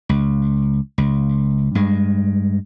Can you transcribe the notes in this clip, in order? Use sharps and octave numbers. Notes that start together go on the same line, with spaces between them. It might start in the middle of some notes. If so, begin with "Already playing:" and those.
C#2
C#2
G2 G#3